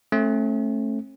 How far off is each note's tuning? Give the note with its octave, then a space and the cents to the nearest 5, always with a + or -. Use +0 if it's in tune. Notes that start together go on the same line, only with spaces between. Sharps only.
A3 +0 C#4 -45